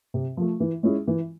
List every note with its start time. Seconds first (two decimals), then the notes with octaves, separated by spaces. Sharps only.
0.14 C3
0.37 F3 A3
0.60 E3
0.83 G#3 C#4 E4 G#4
1.08 E3